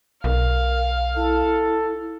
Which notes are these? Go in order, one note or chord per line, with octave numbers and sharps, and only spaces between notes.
B1 A#4 F5
E4 A4